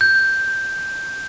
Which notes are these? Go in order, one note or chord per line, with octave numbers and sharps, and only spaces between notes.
G6